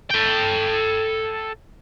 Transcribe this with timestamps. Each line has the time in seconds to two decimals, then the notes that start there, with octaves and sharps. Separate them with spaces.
0.10 A4 G5